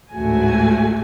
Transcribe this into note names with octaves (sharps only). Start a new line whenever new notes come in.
A1 D2 G#2 A3 F#4 G#5